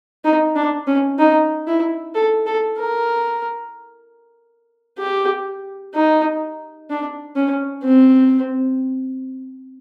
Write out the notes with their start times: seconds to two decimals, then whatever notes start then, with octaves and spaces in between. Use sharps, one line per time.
0.24 D#4
0.56 D4
0.87 C#4
1.19 D#4
1.67 E4
2.15 A4
2.47 A4
2.78 A#4
4.99 G4
5.95 D#4
6.90 D4
7.36 C#4
7.84 C4